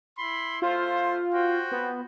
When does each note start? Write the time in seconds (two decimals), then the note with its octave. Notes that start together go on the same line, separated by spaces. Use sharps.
0.18 E4 B5 C6
0.62 A3 F4 C5
1.33 F#4 C5 G5
1.71 B3